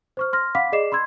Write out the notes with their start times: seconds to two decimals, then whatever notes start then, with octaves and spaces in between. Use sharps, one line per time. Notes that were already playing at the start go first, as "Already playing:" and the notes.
0.17 C5 C#6 F6
0.33 C6 F6 A#6
0.55 F5 F#5 B5 D6 B6
0.72 G#4 D5 D#5 D6 C7 E7
0.92 B5 C6 E6 G#6